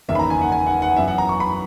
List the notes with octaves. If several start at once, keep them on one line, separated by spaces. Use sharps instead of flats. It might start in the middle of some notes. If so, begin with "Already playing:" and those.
F#1 E2 D#3 A#3 C#4 E5
B5
A#5
G#5
F#5
G#5
F#5
F#5
F#2 E3 B3 E5
F#5
A#5
C#6
B5